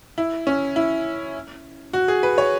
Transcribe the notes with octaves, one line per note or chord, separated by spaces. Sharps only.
E4
C#4
E4
F#4
G#4
B4
C#5